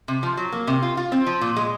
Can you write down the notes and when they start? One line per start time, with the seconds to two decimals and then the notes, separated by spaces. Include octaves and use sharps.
0.08 C3
0.23 F3
0.37 F#3
0.52 A#3
0.67 C3
0.82 F4
0.97 F4
1.12 C4
1.26 F3
1.41 A#2
1.56 G#3